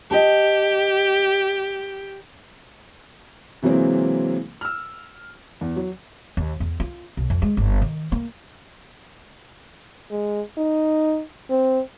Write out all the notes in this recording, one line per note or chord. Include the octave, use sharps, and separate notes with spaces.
G4 D#5 G5 A5
C3 E3 F#3 G#3 A#3 C4
E6 F6
E2
F#3
D#2
E2
F4
B1
F2
G#3
G1
D#3
A#3
G#3
D#4
C4